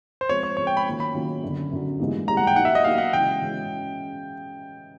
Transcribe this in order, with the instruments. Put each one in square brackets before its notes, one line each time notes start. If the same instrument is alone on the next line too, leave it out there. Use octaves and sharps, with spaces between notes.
[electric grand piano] C5
[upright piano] F3 G#3 C4 [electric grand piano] C#5
[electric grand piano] C#5
[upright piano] F3 G#3 C4 [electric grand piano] C#5
[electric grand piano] G5
B5
[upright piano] D#3 F#3 A#3 C#4 F4
[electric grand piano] B5
[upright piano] D#3 F#3 A#3 C#4 F4
F#2 D3 F#3
F#2 D3 F#3
G#2 E3 G3 A#3 D#4
[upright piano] G#2 E3 G3 A#3 D#4 [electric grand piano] A#5
[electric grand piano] F#5
G5
[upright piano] F#3 A#3 D#4 G4 [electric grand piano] F#5
[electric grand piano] E5
D#5
[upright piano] F#3 A#3 D#4 G4 [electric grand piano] F5
[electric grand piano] F#5
[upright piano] C#3 E3 G#3 C#4 F#4 [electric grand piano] G5
[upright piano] C#3 E3 G#3 C#4 F#4